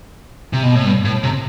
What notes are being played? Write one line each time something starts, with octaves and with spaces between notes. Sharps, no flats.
C3
B2
A2
G2
A2
C3